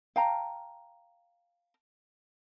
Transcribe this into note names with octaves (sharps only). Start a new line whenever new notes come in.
F5 G5 A5 A#5